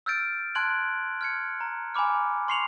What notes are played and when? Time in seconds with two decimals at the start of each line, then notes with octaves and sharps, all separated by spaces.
0.06 E6 F6 G6 A6 D7
0.55 A5 C6 F#6 G#6 D7 F#7
1.21 F6 G#6 C#7
1.61 A#5
1.95 G#5 A#5 B5 D6 F6
2.48 C6 C#6 C7 C#7 F7 F#7